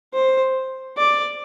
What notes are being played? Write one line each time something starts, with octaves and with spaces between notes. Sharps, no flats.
C5
D5